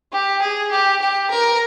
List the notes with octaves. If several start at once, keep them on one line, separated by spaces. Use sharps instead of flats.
G4
G#4
G4
G4
A#4